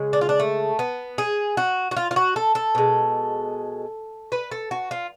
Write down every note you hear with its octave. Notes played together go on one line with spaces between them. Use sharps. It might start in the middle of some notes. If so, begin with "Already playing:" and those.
Already playing: C#3 G#3
D4
F4
D4
A3
B3
G#4
F#4
F#4
F4
F4
F#4
A4
A4
B2 G#3
B4
A4
F#4
F4